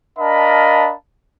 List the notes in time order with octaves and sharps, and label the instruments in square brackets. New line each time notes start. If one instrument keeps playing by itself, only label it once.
[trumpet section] D4 A#4 D#5 F5 A5 B5